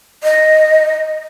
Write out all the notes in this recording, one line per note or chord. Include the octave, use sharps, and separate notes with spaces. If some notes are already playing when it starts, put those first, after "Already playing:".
D#5